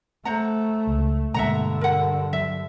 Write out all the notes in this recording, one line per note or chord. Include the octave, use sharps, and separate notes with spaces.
A3 C5 F#5 A#5
C#2
G2 B2 D3 G#3 A#3 E5 F#5 A#5
A#4 F#5
F#3 E5